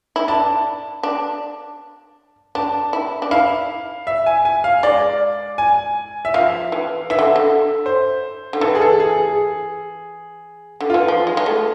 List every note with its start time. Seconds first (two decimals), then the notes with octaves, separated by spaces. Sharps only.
0.16 E4
0.28 D4 A5
1.03 D4
2.55 D4 A5
2.93 E4
3.22 D4
3.31 E4 F5
4.07 E5
4.26 G#5
4.45 G#5
4.64 F5
4.83 G#3 D5
5.58 G#5
6.25 E5
6.34 F3 F5
6.72 E3
7.10 E3 E5
7.19 D3
7.36 D3
7.86 C5
8.53 D3
8.61 E3 A4
8.75 G#4
8.81 A4
9.00 G#4
9.18 G#4
10.81 D3
10.90 E3 F4
11.08 F3
11.27 G#3
11.37 G#3
11.46 A3